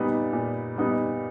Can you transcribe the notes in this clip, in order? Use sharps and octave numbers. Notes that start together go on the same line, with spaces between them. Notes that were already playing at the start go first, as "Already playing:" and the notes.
Already playing: A#2 G3 B3 D#4
A#2
G3 B3 D#4